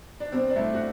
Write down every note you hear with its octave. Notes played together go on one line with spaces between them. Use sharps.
D4
B2 C4
D4
A3 C4 E4
F#4